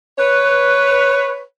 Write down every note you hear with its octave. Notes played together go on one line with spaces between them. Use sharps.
B4 C#5